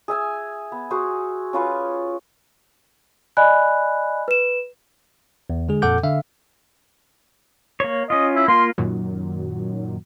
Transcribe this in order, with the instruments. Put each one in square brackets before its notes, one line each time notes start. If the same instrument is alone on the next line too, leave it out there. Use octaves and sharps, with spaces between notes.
[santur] G#4 E5 G#5
B3
F#4 G#4 C5
C#4 F4 B4 C#5
[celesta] D5 D#5 G#5 B5 F#6
B4 E7
[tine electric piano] E2
D3 G#3 G#4
F2 A#2 A4 F#5 D6 G6
D3 E5 F5
[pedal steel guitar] A#3 C#5
[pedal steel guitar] C#4 F4 [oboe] D#5
[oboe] E4
[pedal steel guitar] A#3 F4 [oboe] C6
[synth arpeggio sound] F#2 A#2 D#3 F#3